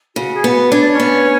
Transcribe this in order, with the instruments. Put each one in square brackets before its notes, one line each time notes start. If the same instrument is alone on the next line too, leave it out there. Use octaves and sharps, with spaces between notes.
[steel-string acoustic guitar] C#3 [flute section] F#4
[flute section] G#4
[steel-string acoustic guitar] B3 [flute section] F#4
[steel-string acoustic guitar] D4 [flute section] C#5
[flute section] D5
C#4 C#5
[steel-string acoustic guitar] B3